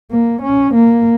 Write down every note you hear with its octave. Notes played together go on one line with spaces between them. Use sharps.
A#3
C#4
A#3